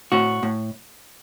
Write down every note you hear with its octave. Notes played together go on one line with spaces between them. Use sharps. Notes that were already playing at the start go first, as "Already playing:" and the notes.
A2 F#4
A2